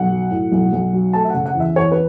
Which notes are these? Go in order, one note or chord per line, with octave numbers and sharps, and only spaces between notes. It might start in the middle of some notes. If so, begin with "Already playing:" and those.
Already playing: B1 F#5
F#3
A2
B1
B1
F#3
A3 A5
E5
C#3 F#5
F#5
E2 E5
E2 C#5
B4